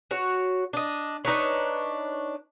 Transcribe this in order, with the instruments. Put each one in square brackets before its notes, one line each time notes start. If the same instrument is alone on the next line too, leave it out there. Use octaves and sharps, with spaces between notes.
[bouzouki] F#4 C#5
D4 D#5
D4 D#4 B4 C#5